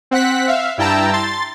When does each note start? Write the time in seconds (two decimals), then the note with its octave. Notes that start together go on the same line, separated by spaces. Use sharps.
0.11 C4 F#5 F#6 B6
0.48 E5 F5
0.78 G2 E4 G5 A5 A#5 E6
1.13 C6 A6